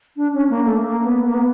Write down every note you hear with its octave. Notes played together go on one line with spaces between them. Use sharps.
D4
C#4
A#3
A3
A#3
B3
A#3
B3